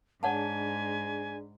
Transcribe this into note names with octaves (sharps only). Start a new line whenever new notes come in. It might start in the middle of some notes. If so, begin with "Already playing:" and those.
G#2 D4 G#4 C#5 D5 F#5 G#5 A5